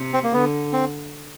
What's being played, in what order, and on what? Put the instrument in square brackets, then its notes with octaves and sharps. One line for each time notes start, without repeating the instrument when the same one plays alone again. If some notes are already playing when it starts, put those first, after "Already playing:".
Already playing: [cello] C3
[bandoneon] C4
A#3
[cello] D3 [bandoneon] B3
[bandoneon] C4